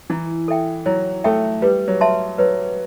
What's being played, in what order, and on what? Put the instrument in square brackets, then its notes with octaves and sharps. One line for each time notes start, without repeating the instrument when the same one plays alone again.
[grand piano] E3 [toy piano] E4
[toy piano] A4 E5 G5
[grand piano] F#3 [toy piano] E4
[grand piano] A3 [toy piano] A4 E5 G5
[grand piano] G3 [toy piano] B4
[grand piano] F#3
[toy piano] E5 A5 C6
[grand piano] F#3 [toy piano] B4